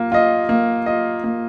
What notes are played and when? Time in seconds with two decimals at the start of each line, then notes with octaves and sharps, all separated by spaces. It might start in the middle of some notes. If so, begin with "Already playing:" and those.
Already playing: A#3 F4
0.12 F4 D#5
0.49 A#3
0.86 F4 D#5
1.24 A#3